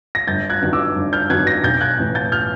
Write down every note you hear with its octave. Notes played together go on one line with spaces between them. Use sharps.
A#6
G1 G6 A6
F#6 G#6
G2 D#3 F#3
D6 E6
G1
F6 G6
G2 D#3 F#3 F#6 G#6
G#6 A#6
B1 G6 A6
F#6 G#6
A2 E3
G6 A6
F6 G6